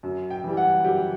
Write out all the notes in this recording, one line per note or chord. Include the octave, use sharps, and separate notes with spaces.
F#2
G5
E3 G3
F#5
F#2 G4